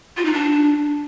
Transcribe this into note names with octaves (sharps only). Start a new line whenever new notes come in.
F4
D#4
D4